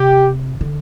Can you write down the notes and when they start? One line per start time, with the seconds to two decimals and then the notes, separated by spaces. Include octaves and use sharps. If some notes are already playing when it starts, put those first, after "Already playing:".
Already playing: C3 G4
0.61 D3